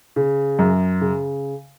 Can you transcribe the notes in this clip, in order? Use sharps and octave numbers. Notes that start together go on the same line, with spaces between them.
C#3
F#2
C#3